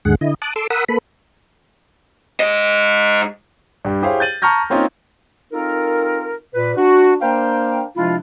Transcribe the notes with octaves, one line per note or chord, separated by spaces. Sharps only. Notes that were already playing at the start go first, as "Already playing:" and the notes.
D#2 G#2 D3 G#3 G#4 F#5
D3 E4 D#5
A5 D6 D#6 F#6
A4 C6 D6 E6
A#4 F#5 B5 D#6 E6
A#3 A4 B4 B5
G#2 D#5
G2 G3
E4 G4 G#4 C5 C#5 F5
G6 A6 D#7 F#7
A5 A#5 C#6 F6 G6 A#6
A#3 C4 C#4 D#4 F4
C4 D#4 F4 A4 A#4
A#2 B4
D4 F#4
A#3 D4 A#4 C5 F5 G5
C3 F3 G#3 D4 E4 F4